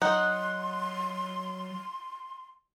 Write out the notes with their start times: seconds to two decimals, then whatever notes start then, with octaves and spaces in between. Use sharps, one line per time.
0.02 F#3 D#4 F#5 C6